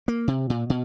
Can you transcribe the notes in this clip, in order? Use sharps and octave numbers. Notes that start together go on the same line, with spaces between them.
A#3
C3
A#2
B2